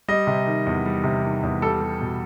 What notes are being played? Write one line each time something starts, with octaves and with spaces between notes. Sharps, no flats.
G3 D#5
C3
D#3
E2
G3
C3
D#3
E2
G3 A4
G3
B2